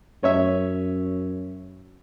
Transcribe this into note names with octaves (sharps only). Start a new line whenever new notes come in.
F#2 C#4 C#5 E5